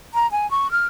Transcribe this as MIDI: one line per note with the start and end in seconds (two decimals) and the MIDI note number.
0.14 0.30 82
0.32 0.49 80
0.51 0.71 85
0.71 0.87 89